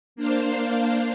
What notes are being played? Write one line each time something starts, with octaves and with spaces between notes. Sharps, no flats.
A#3 D4 C5 F5